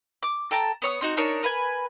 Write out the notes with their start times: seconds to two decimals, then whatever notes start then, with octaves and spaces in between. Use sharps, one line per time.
0.23 D6
0.51 A4 G5 A5 A#5
0.82 B3 C#5 D#6
1.01 C4 D#4 F#4
1.17 D4 D#4 A#4 C#5
1.43 A#4 B4 F#5 G#5